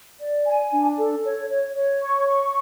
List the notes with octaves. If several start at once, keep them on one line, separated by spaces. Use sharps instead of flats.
D5
G#5
D4
A4
C#5
C#5
C#5
C#6
C#6